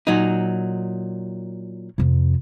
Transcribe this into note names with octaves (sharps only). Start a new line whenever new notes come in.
A#2 F#3 D#4
F2 C3